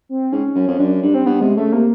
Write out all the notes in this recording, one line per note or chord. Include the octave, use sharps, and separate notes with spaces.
C4
G#2 C#4
F#2
F2
F#2 D4
G2 D4
C4
G2 B3
C3 G#3
C#3 A3
C3 A#3